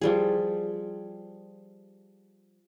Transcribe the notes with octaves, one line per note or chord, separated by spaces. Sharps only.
F3 G3 G#4